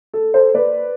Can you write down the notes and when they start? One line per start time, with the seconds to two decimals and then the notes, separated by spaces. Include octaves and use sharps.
0.14 A4
0.34 A4 C5
0.54 B4 D5